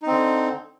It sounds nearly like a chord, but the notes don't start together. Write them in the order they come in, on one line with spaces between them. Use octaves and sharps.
D#4 C4 D3